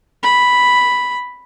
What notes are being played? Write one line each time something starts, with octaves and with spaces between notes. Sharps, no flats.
B5